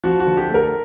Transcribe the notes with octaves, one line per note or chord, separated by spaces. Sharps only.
F3 F#4
F#4
D3
G4
A3 A#4